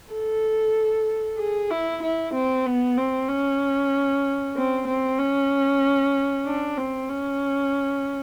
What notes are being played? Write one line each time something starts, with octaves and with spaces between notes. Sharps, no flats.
A4
G#4
E4
E4
C4
B3
C4
C#4
C4
C4
C#4
D4
C4
C#4